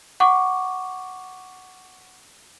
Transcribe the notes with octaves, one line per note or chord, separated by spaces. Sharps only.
F#5 C#6 D6